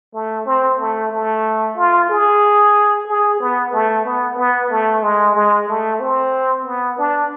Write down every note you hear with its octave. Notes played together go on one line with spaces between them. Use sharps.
A3
C4
A3
A3
F4
G#4
G#4
B3
A3
B3
B3
A3
G#3
G#3
A3
C4
B3
D4